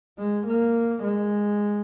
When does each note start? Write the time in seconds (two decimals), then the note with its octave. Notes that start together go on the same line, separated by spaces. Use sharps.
0.19 G#3
0.47 A#3
1.03 G#3